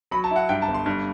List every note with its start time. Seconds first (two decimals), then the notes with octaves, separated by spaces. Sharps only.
0.11 F#3 B5
0.24 A5
0.31 E4
0.36 F#5
0.49 G2 G5
0.62 A5
0.68 G1
0.74 C6
0.86 G2